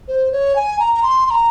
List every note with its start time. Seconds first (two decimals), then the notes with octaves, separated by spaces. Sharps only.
0.08 C5
0.32 C#5
0.56 G#5
0.79 A#5
0.94 A#5
1.03 C6
1.26 C6
1.30 A#5